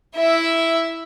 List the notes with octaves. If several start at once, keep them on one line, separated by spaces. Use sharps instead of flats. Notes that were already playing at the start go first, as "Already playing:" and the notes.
E4 E5